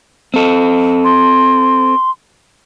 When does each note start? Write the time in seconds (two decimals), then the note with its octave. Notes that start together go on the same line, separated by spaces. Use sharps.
0.34 C4 A4
1.04 C6